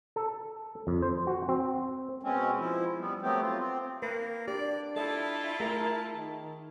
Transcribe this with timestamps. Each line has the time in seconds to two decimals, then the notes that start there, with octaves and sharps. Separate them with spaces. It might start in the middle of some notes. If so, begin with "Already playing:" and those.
0.16 A4
0.87 F2
1.02 C5
1.27 F#4
1.48 C4
2.21 B2 G#3 C4 C#4
2.59 F3 E4
2.99 G3 B3
3.22 F#3 A3 B3 C4 G4
3.42 F4
3.58 C4
4.02 A#3 B4
4.48 D4 G4 D5
4.96 E4 F4 G4 A4 D#5 E5 A5
5.60 A3 G#4 A#4 A#5
6.15 D#3